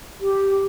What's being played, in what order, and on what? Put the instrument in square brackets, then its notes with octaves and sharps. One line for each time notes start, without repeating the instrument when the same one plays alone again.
[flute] G4